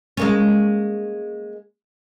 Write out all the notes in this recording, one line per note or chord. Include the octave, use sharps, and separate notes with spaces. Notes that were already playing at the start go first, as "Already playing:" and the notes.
G#3 A#3 C#4